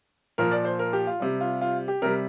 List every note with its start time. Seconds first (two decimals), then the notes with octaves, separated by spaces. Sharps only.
0.38 A#2 F3 A#4
0.51 D5
0.65 C5
0.79 A#4
0.93 G4
1.07 F4
1.20 C3 G3
1.41 F4
1.62 F4
1.88 G4
2.02 C3 G3 A#4